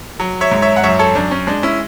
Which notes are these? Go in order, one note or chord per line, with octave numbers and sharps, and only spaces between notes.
F#3
C#5 E5
G#2
C#5 E5
F#5
F#2 C#5 E5
A4 C#5
F#2 D4
C#4
G#3 D4
C#4 E4